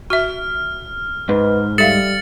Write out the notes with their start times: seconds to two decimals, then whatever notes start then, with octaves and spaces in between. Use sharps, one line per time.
0.10 F#4 E5 F6
1.29 G#2 B4
1.78 G3 A4 E5 F5 A6 C#7 F#7